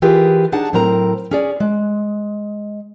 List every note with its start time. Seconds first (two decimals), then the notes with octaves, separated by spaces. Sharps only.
0.02 E3 F4 G4 G#4 A#4 B4
0.52 D4 D#4 G#4 F#5 A5
0.73 A2 F#3 C4 A#4 A#5
1.31 C#4 G#4 D5
1.60 G#3